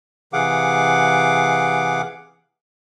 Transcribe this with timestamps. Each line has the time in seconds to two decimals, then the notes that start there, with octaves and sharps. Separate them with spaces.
0.33 C3 E3 G#4 F5 F#5 D6